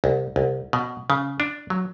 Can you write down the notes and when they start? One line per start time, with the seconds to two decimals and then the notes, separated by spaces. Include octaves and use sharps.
0.04 C2
0.36 C2
0.73 B2
1.10 C#3
1.40 D4
1.70 F#3